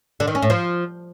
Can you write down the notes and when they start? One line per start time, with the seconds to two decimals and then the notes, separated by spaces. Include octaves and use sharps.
0.20 D3
0.28 D#3
0.35 C#4
0.42 A2
0.50 F3